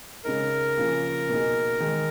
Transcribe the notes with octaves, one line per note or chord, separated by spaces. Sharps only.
C#3 G#3 D#4 A#4
C#3 F3 A#3 F4 G#4
B2 A#3 D#4 G#4
D#3 G#3 D#4